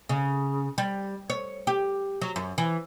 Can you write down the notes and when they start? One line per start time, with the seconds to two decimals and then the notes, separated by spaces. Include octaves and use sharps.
0.09 C#3
0.78 G3
1.30 C#5
1.67 G4
2.21 F#3
2.36 F#2
2.58 E3